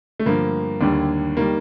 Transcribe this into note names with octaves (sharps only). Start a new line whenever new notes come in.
A3
G2 D3 F3 A#3
D#2 D3 G3
D#3 G3 A#3